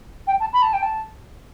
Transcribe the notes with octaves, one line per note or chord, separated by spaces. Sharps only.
G5
A5
B5
A5
G5
A5